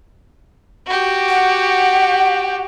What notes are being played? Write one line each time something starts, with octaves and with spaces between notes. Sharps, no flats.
F#4 G4
F#5